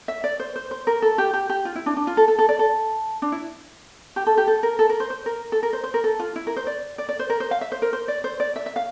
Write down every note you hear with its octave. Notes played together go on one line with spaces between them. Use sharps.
E5
D5
C5
C5
C5
A#4
A4
G4
G4
G4
F4
E4
D4
D4
F4
A4
A4
A4
D5
A4
D4
E4
G4
A4
G4
A4
A#4
A4
A#4
C5
C5
A#4
A4
A#4
C5
C5
A#4
A4
F4
E4
A#4
C5
D5
D5
D5
C5
A#4
C5
F5
E5
C5
A#4
C5
D5
C5
D5
E5
E5
F5